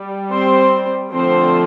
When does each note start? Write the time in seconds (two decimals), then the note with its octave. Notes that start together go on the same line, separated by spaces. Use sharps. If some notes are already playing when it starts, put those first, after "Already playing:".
Already playing: G3
0.31 C4 C5
1.13 D3 F3 A3 C4 C5